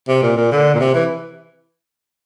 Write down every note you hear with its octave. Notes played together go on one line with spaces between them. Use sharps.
C3
A#2
A#2
D3
A#2
C3
E3